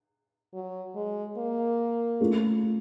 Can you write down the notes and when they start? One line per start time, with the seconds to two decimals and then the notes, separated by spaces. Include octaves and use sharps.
0.54 F#3
0.96 G#3
1.38 A#3
2.21 A3 C#4 F4